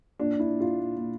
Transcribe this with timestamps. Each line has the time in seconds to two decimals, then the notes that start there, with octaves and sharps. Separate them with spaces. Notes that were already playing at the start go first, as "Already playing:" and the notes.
0.20 A#2 D4
0.35 A#2
0.40 E4
0.49 A#2
0.60 F4
0.66 A#2
0.80 A#2
0.96 A#2